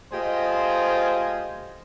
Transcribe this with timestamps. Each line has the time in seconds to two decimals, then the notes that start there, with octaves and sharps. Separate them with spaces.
0.12 A3 F4 G4 G#4 C5 D#5